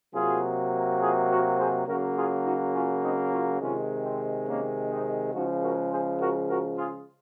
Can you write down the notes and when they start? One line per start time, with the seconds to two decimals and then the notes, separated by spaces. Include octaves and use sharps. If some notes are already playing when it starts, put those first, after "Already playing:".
0.14 C3 F#3 A#3 F4 G#4
1.00 F4 G#4
1.29 F#4 A#4
1.58 G#4 C5
1.86 C#3 F#3 A#3 F#4 A#4
2.16 F4 G#4
2.44 D#4 F#4
2.73 C#4 F4
3.02 C4 D#4
3.31 C#4 F4
3.60 C3 D#3 G#3 C#4 F4
4.04 C4
4.46 A#3 C#4
4.90 C4 D#4
5.33 C#3 F3 G#3 D#4 F#4
5.61 F#4 A#4
5.90 G#4 C5
6.19 F#4 A#4
6.48 F#4 A#4
6.77 F4 G#4